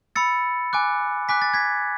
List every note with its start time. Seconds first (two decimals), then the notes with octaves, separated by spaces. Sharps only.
0.16 B5 E6 A6 C#7
0.73 G#5 D6 F#6
1.29 G#5 D6 F#6 B6
1.42 A6
1.54 G#6 B6